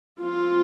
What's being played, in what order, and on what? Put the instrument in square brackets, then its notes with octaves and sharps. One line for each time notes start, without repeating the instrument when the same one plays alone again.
[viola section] F3 C4 F4